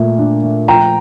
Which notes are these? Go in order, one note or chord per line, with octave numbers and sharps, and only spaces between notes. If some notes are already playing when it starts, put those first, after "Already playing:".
Already playing: A#2 A3
D4
A3
F3 G5 A#5